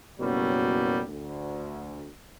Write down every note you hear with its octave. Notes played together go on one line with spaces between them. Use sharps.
F#1 F#2 B2 F#3 G3
D2